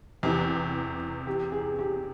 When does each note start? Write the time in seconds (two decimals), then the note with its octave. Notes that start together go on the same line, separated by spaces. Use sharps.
0.23 E2 C3 E3 G4
1.27 G4
1.52 G#4
1.79 G4